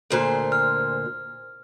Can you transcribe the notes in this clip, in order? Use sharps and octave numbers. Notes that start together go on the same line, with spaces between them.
D2 A#2 A4 C5
F6